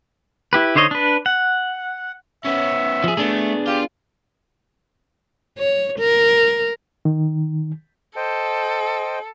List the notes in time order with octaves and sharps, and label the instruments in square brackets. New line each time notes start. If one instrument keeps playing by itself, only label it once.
[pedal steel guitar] E4 G4 B4
D3 D#4 C5 C#5 D#5
D4 B4
F#5
[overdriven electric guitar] B3 C#4 [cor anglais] E5
[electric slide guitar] F3 G#4
[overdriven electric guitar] A3 [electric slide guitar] B3 D4 G#4
[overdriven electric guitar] F4 [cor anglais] G4
[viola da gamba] C#5
A#4
[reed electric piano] D#3
[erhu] A4 [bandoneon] C5 D#5 G5